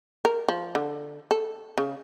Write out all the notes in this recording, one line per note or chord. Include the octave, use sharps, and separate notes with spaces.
A#4
F3
D3
A4
C#3